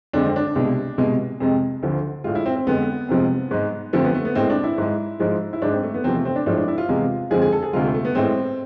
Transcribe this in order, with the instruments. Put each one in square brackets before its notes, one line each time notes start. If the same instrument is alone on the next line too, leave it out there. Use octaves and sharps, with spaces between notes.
[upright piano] F2 D3 G#3 D4
C4
D4
C2 B2 G#3
C2 B2 G#3
F2 C3 G#3
D2 D3 F3
A2 G#3 F4
E4
C4
C4
F2 D3 G#3 B3
F2 C3 F3 G#3
G#2 G#3
F2 D3 F3 A3
B3
A3
B3
A2 G#3 C4
D4
E4
G#2 G#3
G#2 F3 G#3
E4
G#2 G#3 D4
C4
A3
B3
E2 C3 F3 C4
A3
C4
D4
A2 F3 G#3 D4
D4
E4
F4
E2 C3 G#3 F4
F2 D3 F3 G#3 G#4
G#4
A4
G#4
D2 C3 G#3 F4
A3
A3
B3
A2 G#3 C4